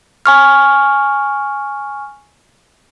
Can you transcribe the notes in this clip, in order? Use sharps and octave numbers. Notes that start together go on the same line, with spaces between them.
G#5 C#6 F6